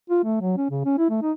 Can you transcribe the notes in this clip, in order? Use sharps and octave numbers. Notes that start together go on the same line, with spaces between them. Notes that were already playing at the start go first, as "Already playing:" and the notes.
F4
A3
F#3
C#4
C#3
C#4
E4
A3
D#4